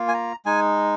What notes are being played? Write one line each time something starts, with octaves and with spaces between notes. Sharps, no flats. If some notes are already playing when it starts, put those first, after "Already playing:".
Already playing: A#3 F4
G#5
A#5
G#3 D#4 G#5